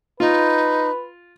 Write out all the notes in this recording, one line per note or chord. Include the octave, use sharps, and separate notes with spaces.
D#4 F4 B4